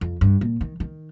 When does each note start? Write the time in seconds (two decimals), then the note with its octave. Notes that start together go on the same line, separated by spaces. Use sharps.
0.01 F2
0.21 G2
0.41 A#2
0.61 D#3
0.80 D#3